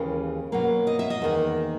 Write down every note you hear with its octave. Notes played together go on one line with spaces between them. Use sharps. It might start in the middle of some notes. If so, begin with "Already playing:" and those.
Already playing: D#2 C#3 E3 G#3
B2 F#3 A#3
D#5
E5
D#5
E2 D#3 A#3